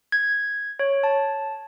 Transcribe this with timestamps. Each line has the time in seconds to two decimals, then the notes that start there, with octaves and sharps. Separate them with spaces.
0.12 G#6
0.79 C#5
1.03 A5